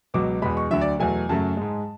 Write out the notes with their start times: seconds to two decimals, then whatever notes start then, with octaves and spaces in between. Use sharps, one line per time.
0.14 C#2 B2 F#3 D6
0.42 E2 B2 G#3 B5
0.57 C#6
0.71 D2 D3 F#3 E5
0.81 D5
1.00 E2 B2 F#3 A3 G#5
1.29 F#2 C#3 F#3 A3 A5
1.57 G#2 G#3